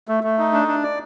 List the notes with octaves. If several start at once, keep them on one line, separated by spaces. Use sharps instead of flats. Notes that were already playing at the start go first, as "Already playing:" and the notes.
A3
A3
D#4
D4
D4
D5